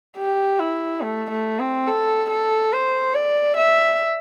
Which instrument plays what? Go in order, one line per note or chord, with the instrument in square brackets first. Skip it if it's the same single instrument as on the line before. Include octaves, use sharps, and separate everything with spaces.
[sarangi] G4
E4
A3
A3
C4
A4
A4
C5
D5
E5